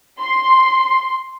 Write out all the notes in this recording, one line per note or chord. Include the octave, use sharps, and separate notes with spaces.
C6